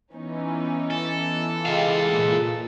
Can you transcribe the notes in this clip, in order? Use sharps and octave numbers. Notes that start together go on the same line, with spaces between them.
E3 B3 C#4 D#4
A4
F4 G4 G#4 D#5 F5
A#2